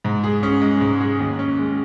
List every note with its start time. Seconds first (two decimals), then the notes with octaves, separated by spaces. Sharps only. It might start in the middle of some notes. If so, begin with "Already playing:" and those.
0.04 G#2
0.24 G#4
0.43 C#4
0.62 G#3
0.81 G#2
1.01 G#4
1.19 D#2
1.39 C#4
1.58 G#3